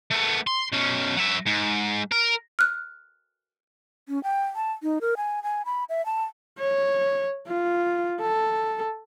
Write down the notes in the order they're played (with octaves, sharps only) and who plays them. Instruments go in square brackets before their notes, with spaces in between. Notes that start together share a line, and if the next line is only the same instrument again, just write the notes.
[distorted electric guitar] A3 B3
C6
B2 C#4
F#3 E5
G#2
A#4
[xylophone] F6 F#6
[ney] C#4
G5
A5
D#4
A#4
G#5
G#5
B5
E5
A5
[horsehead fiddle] C#5
F4
A4